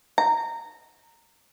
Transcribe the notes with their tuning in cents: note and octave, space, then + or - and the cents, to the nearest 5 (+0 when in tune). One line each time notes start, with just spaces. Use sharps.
A#5 -20